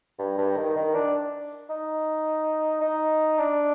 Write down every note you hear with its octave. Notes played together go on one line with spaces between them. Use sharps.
G2
G2
D#3
D#3
D4
D#4
D#4
D4